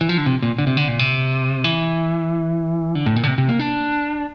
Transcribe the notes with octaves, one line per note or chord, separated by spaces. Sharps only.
E3
F3
D3
C3
A#2
D3
C3
D3
A#2
C3
E3
D3
A2
A#2
D3
C3
C3
A#3
D4